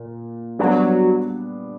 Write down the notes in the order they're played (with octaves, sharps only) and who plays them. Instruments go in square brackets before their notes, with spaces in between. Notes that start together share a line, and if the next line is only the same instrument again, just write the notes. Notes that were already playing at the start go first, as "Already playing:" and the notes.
Already playing: [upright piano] A#2
[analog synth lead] F#3 [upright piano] G3 B3 D4